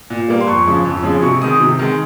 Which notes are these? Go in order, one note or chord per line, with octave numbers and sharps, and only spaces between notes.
A#2
G3 A#3
C6
F2 C#6
C#3 F3 G#3
F2
C#3 F3 G#3
C3 C#6
D#3 G#3 D#6
C3
D#3 G#3